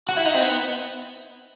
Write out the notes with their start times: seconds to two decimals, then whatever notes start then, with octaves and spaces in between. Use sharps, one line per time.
0.09 F#4
0.17 E4
0.25 D#4
0.34 C4
0.42 B3